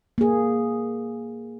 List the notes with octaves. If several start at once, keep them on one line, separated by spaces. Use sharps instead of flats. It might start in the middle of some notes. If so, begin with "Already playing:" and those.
A#3 G#4